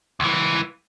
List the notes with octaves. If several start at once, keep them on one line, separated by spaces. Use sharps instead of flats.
C#2 E3